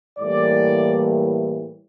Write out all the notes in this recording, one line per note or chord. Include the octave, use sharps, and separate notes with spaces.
A2 E3 G3 A#3 D5